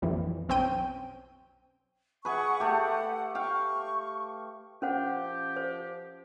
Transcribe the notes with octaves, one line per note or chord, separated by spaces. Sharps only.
A#1 F2 E3
B1 C4 C#4 G5 D#7
G#4 B4 E5 F#5 C#6
A3 G4 F#5
F5 G5 C#6
F3 C#4 F4 G4 C5 F#5
C5